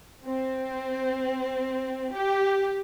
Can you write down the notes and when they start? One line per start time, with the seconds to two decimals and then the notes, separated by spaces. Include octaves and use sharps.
0.24 C4
2.12 G4